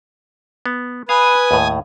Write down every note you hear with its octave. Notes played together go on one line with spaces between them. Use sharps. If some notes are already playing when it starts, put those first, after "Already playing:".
B3
B4 F5 G#5 D#6
D#2 A2